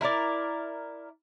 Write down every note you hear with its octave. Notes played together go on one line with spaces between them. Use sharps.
E4 A#4 C5 D5